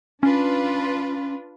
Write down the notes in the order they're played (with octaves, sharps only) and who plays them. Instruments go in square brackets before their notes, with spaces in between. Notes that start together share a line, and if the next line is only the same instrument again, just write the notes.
[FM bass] C#4 [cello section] D4 F4 B4